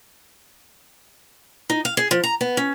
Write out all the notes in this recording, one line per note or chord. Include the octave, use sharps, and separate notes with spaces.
D#4
F5
G#4
F3
A#5
B3
C#4